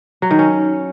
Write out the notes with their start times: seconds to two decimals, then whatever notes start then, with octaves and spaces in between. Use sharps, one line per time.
0.22 F#3
0.31 D#3
0.39 C#4